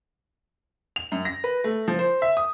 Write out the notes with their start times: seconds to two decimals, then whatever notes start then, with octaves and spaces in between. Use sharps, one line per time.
0.96 F7
1.12 F#2
1.25 A#6
1.44 B4
1.64 A3
1.88 F3
1.99 C5
2.22 E5
2.37 D#6